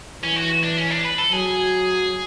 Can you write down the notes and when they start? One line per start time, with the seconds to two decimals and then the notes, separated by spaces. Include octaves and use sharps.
0.23 E3 C#4
0.36 F#4
0.64 D4
0.77 C#4
0.90 D4
1.04 B4
1.18 A4
1.32 F#3 G#4